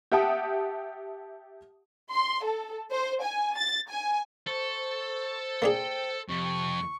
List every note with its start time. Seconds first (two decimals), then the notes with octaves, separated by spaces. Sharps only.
0.12 G4 E5 F#5 G5 A5 D#6
2.10 C6
2.43 A4
2.90 C5
3.22 G#5
3.56 A6
3.89 G#5
4.47 A4 C5 C#6
5.62 A#3 D4 G#4 G5
6.29 F2 C3 C#6